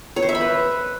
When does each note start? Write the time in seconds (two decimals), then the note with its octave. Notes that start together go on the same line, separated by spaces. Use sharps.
0.16 C#5
0.23 C5
0.29 E5
0.35 B5
0.41 B4